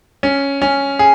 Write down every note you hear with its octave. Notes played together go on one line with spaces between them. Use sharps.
C#4
C#4
G#4